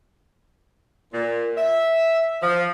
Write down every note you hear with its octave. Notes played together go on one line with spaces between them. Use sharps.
A#2
E5
F3